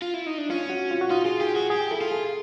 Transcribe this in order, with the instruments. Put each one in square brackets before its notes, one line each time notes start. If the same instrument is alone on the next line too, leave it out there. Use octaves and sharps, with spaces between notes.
[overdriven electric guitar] F4
E4
D#4
D4
[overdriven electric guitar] C#4 [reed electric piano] F4
[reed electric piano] F#4
F4
F#4
[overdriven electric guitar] D#4 [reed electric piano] F4
[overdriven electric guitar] F4 [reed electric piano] G#4
[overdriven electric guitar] G4 [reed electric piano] G#4
[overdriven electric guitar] F#4 [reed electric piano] G#4
[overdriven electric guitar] G4 [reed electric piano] G#4
[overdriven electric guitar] E4 [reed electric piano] A4
[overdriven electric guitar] F4
[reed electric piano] G#4